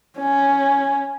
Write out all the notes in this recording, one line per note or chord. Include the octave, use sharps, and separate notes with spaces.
C#4